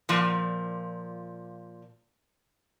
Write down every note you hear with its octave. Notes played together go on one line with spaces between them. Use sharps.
A#2 F3